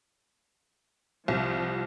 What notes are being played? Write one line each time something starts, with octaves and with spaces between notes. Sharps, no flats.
C2 F3